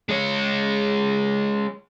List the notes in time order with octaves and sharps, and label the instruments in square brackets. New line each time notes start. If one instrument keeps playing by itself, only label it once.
[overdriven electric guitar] G#3 C#5